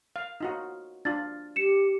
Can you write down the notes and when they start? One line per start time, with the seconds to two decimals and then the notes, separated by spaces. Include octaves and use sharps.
0.16 F5
0.41 D#4 F4 F#4
1.05 D4 F4 A6
1.56 G4 C#7 E7